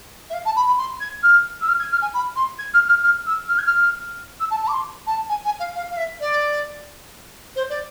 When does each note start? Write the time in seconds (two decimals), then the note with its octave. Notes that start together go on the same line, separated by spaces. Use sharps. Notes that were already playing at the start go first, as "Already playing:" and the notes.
0.29 E5
0.33 F5
0.45 A5
0.55 B5
0.66 B5
0.77 C6
1.00 G#6
1.22 F6
1.61 E6
1.68 F6
1.79 G#6
1.91 F6
2.01 G#5
2.13 B5
2.35 C6
2.58 G#6
2.73 F6
2.88 F6
3.03 F6
3.26 E6
3.48 F6
3.58 G#6
3.66 F6
4.39 E6
4.50 A5
4.62 A5
4.67 D6
4.72 C6
5.06 A5
5.28 G#5
5.44 G#5
5.59 F5
5.75 F5
5.89 F5
5.96 E5
6.20 D5
7.55 C5
7.69 D5